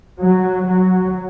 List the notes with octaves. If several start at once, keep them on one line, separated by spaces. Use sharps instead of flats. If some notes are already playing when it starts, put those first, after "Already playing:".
F#3
F#3